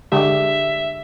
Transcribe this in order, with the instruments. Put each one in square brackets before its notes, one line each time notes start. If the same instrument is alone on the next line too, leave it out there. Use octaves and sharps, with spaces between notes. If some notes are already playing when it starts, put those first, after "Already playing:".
[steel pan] D3 G#3 G4 [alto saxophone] E5